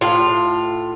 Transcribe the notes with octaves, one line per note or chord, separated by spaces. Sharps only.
A2 F4